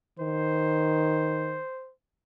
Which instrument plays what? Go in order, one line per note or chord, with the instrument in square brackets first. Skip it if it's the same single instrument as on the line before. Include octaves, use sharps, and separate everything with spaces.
[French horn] D#3 [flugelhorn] C5